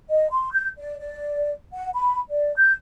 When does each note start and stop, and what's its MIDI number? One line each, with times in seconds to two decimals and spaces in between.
0.09 0.29 75
0.30 0.51 84
0.52 0.68 91
0.78 0.99 74
0.99 1.51 74
1.73 1.90 78
1.95 2.18 83
2.30 2.54 74
2.56 2.73 91